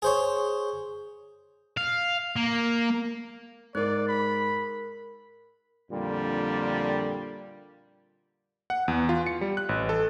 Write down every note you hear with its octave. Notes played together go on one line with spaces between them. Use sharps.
G#4 C5 C#5
F5
A#3
G#2 A#4 D5 F#6
B5
F2 A#2 D3 G3
F#5
E2
F4
C#7
G3
F#6
A1
A4